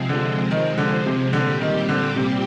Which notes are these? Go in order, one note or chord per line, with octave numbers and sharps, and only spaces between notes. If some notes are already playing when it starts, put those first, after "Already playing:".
Already playing: C3 F3 G#3 C4
D3
D#3
D3
C3
A#2 D3 G3 C4 G4
D#3
D3
C3